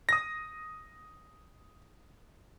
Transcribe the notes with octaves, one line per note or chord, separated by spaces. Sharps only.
D#6 A#6